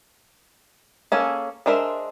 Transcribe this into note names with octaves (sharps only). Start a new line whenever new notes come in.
A#3 C#4 G#4 A4
G#3 D4 A#4 C5 E5